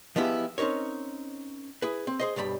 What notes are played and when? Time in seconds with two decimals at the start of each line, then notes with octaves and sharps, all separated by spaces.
0.16 F3 G#3 B3 E4 G4
0.58 C4 C#4 D#4 A#4 C#5
1.82 E4 G#4 B4
2.07 C4
2.19 G#4 C5 D#5
2.36 B1 G2 G3 A#5 B5